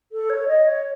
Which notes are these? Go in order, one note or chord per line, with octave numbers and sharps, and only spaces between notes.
A4
C#5
D#5
C#5